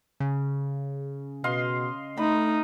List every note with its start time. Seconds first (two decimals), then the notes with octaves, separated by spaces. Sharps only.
0.20 C#3
1.44 B2 D#5 F5 C6
2.17 A3 D#4 B5